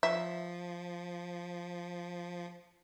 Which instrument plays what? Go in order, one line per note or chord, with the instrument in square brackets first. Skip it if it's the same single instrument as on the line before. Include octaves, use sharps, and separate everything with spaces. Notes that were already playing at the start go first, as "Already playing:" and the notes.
[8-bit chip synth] F3 [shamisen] E5